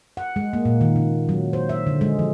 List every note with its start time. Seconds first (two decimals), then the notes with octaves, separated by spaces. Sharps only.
0.17 F#5
0.36 G#3
0.53 A#3
0.65 A#2
0.81 D#3
0.96 C#3
1.29 F#3
1.53 C5
1.69 E5
1.87 D3
2.01 G#3
2.19 F3